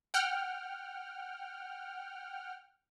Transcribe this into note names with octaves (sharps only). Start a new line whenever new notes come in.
F#5 G5 F6